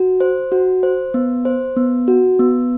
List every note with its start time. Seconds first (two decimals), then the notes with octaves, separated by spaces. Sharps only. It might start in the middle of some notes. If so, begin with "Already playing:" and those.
Already playing: F#4
0.20 C5
0.52 F#4
0.83 C5
1.14 B3
1.45 C5
1.77 B3
2.08 F#4
2.39 B3